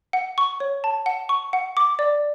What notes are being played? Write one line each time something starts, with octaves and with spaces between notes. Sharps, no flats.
F#5
C#6
C#5
A5
F#5
C#6
F#5
D6
D5